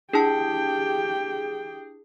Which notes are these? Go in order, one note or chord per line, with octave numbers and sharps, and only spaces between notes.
D4 E4 G4 G#4 G5 A5